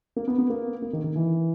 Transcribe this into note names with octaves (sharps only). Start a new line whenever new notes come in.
A#3
B3
B3
A#3
A#3
D#3
D#3
E3